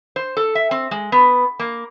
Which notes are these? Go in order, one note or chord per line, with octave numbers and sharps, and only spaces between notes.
C5
A4
E5
C4
G#3
B3
A#3